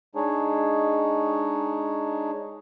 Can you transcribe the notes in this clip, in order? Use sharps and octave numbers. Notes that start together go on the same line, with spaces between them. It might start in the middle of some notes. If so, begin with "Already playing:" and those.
G#3 D4 D#4 G#4 C#5